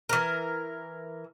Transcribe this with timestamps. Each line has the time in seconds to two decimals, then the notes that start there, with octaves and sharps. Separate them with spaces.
0.09 E3 A#4